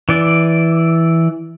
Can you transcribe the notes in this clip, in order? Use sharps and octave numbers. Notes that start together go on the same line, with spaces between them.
E3 D5